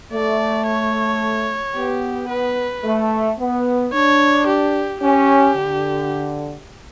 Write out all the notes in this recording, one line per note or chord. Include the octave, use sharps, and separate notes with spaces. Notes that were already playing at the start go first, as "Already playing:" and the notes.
A3 D5
C#5
B3 G4
B4
A3
B3
D4 C#5
G4
C#4 G4
D3